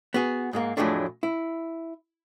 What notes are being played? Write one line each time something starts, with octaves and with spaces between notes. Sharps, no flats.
B3 F#4 G#4
G#2 G#3 A#3
F2 A2 F#3 G#3 A3 D4
E4